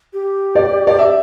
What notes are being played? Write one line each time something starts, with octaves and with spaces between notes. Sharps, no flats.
G4
D5
D5
E5